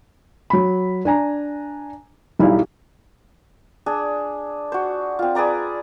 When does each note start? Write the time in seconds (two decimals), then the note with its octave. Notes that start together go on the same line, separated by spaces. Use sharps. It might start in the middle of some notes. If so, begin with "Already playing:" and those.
0.50 F#3 B5
1.05 D4 G#5 A#5
2.39 B1 G3 D#4 E4 D5 F5
3.86 D4 G#4
4.72 F#4 C5
5.19 C4 F4
5.35 G#4 B4 D5 A#5